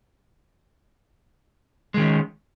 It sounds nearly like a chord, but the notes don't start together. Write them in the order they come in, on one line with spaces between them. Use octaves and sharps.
G#3 D#3 C#4